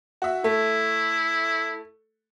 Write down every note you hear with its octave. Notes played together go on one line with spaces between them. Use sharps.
F#4 E5
A3 E4